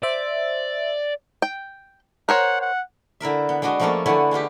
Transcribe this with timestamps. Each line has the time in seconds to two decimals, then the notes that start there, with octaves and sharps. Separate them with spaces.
0.03 C5 D5 E5
1.42 G5
2.29 A#4 C5 C#5 F#5
2.61 F#5
3.20 D3 E4 A#4 E5
3.49 B3
3.62 G#3 B3 D4 F#4 D#5
3.80 F3 A3 A#3 C#4 F4 A4
4.06 D3 A3 B3 E4 C#5 G#5
4.31 G#3 B3 F4 G4